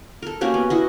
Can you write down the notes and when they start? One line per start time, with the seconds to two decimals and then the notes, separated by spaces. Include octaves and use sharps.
0.22 A4 A#4
0.41 A#3 C#4 F#4 G4
0.54 B3
0.70 E4 F#4 D#5